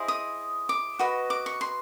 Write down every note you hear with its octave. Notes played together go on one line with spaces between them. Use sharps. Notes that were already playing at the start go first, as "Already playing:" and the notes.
Already playing: E4 G#4 C5 D#5
D#6
D6
F#4 B4 D#5
D6
C#6
C6